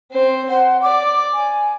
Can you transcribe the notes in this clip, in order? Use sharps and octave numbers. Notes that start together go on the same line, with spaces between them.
C4 C5
C5 F#5
D5 D6
G#5